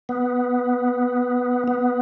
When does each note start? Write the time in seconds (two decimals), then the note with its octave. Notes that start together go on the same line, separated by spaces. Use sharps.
0.09 B3
1.68 B3